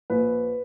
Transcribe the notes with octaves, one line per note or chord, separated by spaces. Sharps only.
A#1 B4